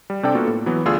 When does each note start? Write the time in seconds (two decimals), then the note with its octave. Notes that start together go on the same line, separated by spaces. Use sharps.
0.10 G3
0.23 C3 D4 A4 C5 D5 G5
0.35 A#3 B3 F4 F#4 A4
0.47 A2
0.66 E3 F#3 B3 E4
0.85 D2 A3 F4 G#4 D5 E6